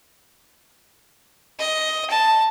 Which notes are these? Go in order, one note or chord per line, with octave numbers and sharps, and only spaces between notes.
D#5
A5